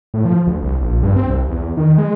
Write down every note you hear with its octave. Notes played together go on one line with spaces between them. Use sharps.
A2
F3
D2
C2
A#1
G2
C4
C2
E2
D#3
G#3